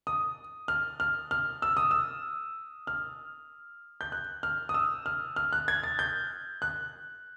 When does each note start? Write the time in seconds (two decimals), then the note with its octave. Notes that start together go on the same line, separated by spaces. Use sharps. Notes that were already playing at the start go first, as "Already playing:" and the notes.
0.07 D#6
0.68 F6
1.00 F6
1.31 F6
1.62 E6
1.77 D#6
1.91 E6
2.87 F6
4.01 G6
4.12 F#6
4.43 F6
4.69 D#6
4.74 E6
5.06 F6
5.36 F6
5.53 F#6
5.68 G#6
5.84 A6
5.99 G6
6.62 F#6